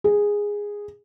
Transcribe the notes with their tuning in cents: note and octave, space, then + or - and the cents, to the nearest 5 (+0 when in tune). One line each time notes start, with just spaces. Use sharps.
G#4 -10